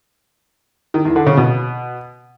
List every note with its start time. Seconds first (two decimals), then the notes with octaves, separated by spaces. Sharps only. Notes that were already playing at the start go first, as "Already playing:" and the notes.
0.94 D#3
1.05 E2
1.16 D3
1.27 C#3
1.37 B2